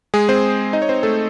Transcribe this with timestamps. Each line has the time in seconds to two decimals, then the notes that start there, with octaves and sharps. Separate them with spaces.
0.14 G#3 G#4
0.29 C4 C5
0.73 D#4 D#5
0.82 C#5
0.89 C4 C5
1.03 A3 A4